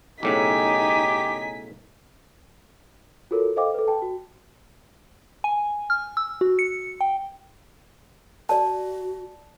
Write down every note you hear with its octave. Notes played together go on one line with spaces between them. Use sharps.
B1 A2 C#3 D#4 G4 G#5 B6
F4 F#4 A4 A#4 C#5
A4 C5 D#5 F5 G5 D6
A4 B4
G5 A5
F#4
G#5
F6
E6
F#4
C#7
G5
F#4 D5 A5